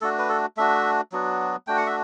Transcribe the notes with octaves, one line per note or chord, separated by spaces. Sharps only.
A3 D4 F#4 A4
B4
A4
A3 D4 F#4 E5
F#3 B3 D4 F#4
A3 D4 F#4 G5
F#5
E5